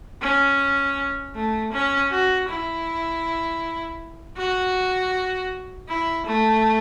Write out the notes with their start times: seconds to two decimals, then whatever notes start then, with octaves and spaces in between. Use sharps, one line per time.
0.21 C#4
1.35 A3
1.72 C#4
2.11 F#4
2.49 E4
4.37 F#4
5.89 E4
6.26 A3